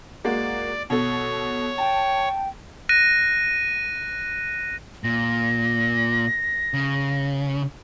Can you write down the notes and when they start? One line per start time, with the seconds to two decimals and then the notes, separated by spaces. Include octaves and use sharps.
0.25 G#3 A#3 F#4 D5
0.90 B2 A4 C#5
1.78 G5 A5
2.89 F#6 A#6 D#7
5.04 A#2 A#6
6.74 C#3